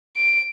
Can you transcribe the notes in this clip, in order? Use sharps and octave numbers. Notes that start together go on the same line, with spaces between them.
D7